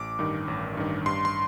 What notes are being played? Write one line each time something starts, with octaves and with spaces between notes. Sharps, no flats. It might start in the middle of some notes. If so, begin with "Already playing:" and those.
Already playing: A1 D6
G2 D#3
A1
G2 D#3
G2 C6
C6